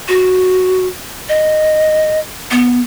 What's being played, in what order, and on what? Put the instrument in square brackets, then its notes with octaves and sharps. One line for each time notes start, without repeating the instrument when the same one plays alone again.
[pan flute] F#4
D#5
B3